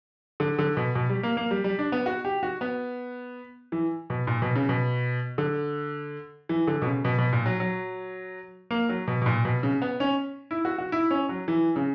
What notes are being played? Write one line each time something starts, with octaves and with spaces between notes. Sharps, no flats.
D3
D3
B2
B2
G3
A#3
A#3
G3
G3
D4
B3
F#4
G4
F#4
B3
E3
B2
A#2
B2
C#3
B2
D3
E3
D3
B2
C#3
B2
B2
A#2
F#3
F#3
A#3
F#3
B2
B2
A#2
B2
C#3
B3
C#4
E4
F#4
F#4
E4
C#4
F#3
E3
C#3